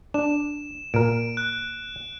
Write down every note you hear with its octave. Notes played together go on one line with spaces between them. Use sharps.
D4 E7
A#2 A#4 D7
F#6